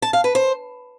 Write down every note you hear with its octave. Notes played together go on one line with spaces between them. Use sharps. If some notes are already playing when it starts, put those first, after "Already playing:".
A5
F5
B4
C5